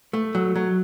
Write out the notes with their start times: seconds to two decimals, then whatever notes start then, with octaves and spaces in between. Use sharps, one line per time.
0.13 A3
0.35 F#3
0.56 F#3